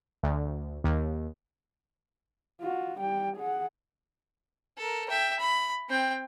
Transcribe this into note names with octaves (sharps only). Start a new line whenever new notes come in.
D2
D#2
F4 F#4
G3 G5
G#4 F#5
A4 A#4
E5 G5
B5
C4 G5